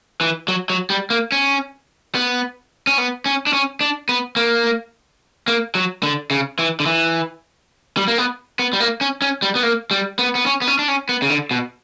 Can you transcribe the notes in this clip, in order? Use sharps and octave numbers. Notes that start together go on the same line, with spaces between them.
E3
F#3
F#3
G3
A#3
C#4
B3
C#4
B3
C#4
D4
C#4
D4
B3
A#3
A#3
F#3
D3
C#3
E3
D3
E3
G3
A#3
B3
B3
G3
A#3
C#4
C#4
G3
B3
A#3
G3
B3
B3
C#4
B3
C#4
D4
C#4
B3
C#3
D3
B2